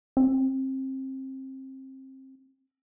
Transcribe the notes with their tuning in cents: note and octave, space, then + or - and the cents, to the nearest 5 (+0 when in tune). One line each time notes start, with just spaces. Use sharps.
C4 +25